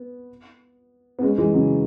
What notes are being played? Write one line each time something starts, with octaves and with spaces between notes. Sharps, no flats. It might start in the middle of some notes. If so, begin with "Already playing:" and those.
Already playing: B3
B3
G#3 C#4
E3 G#3
C#3 F#3